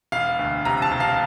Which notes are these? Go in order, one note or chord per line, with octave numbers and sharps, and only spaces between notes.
E1 F5
D2
C3 A#5
A5
E1
F5